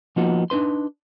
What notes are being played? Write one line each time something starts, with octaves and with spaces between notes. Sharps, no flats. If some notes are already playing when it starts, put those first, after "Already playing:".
F3 A#3 B3 D#4 F4 F#4
D4 D#4 B4 C6